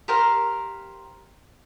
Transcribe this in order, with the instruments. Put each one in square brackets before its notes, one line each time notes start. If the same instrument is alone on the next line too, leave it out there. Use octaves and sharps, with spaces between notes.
[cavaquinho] G4 A#4 C5 F5